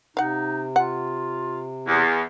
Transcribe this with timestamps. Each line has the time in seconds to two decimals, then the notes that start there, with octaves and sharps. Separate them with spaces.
0.17 C3 D#4 F5 F#5
0.76 F4 F#5
1.88 E2